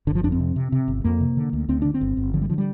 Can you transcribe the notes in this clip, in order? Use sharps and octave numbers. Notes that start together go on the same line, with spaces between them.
G1 D3
F3
F2 D4
C4
C3
C3
C3
G1
F2 A#3
C3
D3
D2
D2 C4
D3 D4
C4
G1
G1
D3 F3
G3
D3 F3
G3